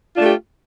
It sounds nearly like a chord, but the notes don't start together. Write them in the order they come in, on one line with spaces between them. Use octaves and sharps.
F4 D4 A3 G4